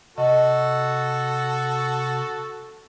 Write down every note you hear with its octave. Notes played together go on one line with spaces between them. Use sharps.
C3 F#4 A4 D#5